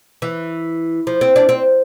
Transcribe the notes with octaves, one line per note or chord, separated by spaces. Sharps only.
E3
F3
C4
D4
C4